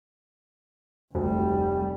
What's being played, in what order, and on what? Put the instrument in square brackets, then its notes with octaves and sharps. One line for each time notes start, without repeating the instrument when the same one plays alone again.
[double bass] F1 G3 [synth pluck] D2